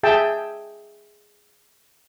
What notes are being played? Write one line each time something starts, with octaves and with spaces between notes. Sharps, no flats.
G#4 E5 G5 A5